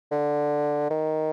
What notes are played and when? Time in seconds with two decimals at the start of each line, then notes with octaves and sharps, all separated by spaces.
0.11 D3
0.90 D#3